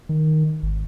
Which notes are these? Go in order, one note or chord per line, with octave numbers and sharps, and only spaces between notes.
D#3
G#1